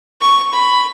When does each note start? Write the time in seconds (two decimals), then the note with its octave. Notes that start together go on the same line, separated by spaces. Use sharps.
0.21 C#6
0.53 B5